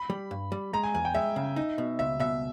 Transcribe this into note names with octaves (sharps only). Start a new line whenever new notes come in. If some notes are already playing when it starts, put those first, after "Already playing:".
Already playing: B5
G3
G2
G3
G#3 A#5
G#5
E2 G#5
G5
G#3 E5
C#3
D#4
B2
C#2 E5
B2 E5